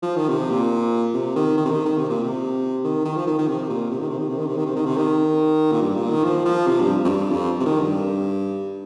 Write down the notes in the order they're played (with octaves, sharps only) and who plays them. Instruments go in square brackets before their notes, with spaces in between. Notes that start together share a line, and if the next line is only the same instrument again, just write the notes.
[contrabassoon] F3
D#3
C3
A#2
C3
D#3
D#3
C3
D#3
D#3
C3
A#2
C3
D#3
D#3
F3
D#3
D#3
C3
A#2
C3
D#3
C3
D#3
C3
D#3
C3
D#3
C3
D#3
C3
D#3
A#2
G2
A#2
D#3
F3
F3
C3
G2
F2
G2
F2
C3
D#3
G2